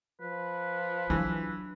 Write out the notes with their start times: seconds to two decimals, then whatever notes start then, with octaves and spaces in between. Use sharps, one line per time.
0.21 F3 B4
1.10 E3 F#3 D4